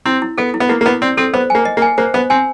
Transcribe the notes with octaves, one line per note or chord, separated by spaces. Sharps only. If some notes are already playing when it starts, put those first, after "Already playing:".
C4 E4
E4
B3 A4
E4
B3
A#3 E4
A#3
B3 E4
C4 D5
C4 A4
B3 C5
A#3 G#5
D#5
A#3
G#5
A#3 C5
B3 C5
C4 G#5